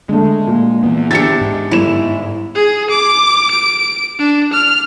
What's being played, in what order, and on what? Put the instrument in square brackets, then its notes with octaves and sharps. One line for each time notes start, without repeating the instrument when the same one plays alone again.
[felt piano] D3 A3 [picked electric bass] G#3
[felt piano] A#2
[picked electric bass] E3 B3
[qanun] D4 G4 E5 [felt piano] A6 C#7
[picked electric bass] G#2
[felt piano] G1 E7 [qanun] E4
[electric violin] G#4
D6
D7
D4
F6